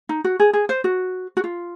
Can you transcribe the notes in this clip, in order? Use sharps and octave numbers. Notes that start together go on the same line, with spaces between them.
D#4
F#4
G#4
G#4
C5
F#4
F#4
F4